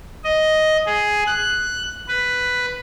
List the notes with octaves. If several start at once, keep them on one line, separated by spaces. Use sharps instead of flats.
D#5
G#4
F#6
B4